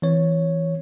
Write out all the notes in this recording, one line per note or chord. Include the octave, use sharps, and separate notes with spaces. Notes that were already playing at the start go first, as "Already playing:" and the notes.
E3 C4 C#5